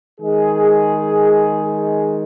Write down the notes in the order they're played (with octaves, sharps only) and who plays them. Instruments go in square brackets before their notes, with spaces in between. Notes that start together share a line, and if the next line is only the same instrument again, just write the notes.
[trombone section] D#3 G#3 G#4